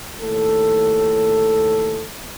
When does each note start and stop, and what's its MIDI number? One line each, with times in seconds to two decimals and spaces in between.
0.21 2.03 39
0.21 2.03 45
0.21 2.03 69